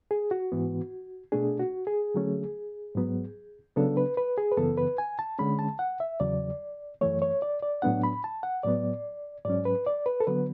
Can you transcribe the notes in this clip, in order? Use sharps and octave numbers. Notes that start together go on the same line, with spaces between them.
G#4
F#4
G#2 E3 B3
B2 A3 D4 G#4
F#4
G#4
D3 F#3 A3 C#4
G#2 F#3 B3
C#3 F#3 B3 D4 A4
B4
B4
G#4
B4
F#2 C#3 E3 B3 A4
B4
G#5
A5
D3 G#3 C#4 B5
A5
F#5
E5
E2 C#3 F#3 D5
F#2 E3 A3 C#5
C#5
D5
D5
A2 F#3 B3 D4 F#5
B5
A5
F#5
A2 F#3 B3 D5
G#2 F#3 C#4 D5
B4
D5
B4
A4
D3 F#3 B3 B4